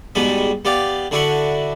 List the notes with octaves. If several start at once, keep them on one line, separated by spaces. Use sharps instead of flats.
G#2 B2 G3 B3 B5
B3 G4 D5 F5
D3 D4 E4 F#4 E5 F#5